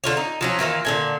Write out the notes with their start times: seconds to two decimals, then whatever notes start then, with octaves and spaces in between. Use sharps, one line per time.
0.04 D3 F4 C#5
0.17 D#4
0.41 F3 F#3 C#4
0.59 D#3 E3 A#3 F4
0.85 A#2 D3 G#5